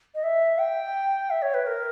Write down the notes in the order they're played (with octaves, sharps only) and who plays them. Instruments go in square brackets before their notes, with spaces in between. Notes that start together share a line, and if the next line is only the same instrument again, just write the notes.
[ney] D#5
E5
G5
E5
C#5
B4
A#4